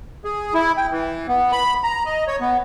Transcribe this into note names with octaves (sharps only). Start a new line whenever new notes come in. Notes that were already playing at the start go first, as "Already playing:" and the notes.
G#4
E4
G5
E3
B3
B5
A#5
D#5
C#5
B3